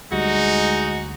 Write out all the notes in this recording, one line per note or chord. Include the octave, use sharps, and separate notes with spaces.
D2 G3 G#3 D#4 F#4